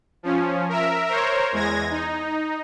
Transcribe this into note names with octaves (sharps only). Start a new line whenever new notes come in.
F3 C#4
A#4 E5
A#4 C5 C#5
E2 G#3 G#6 A#6
D#4